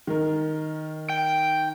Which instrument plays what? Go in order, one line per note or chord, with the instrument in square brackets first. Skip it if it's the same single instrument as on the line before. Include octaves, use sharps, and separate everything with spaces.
[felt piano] D#3 A#4
[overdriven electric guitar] G5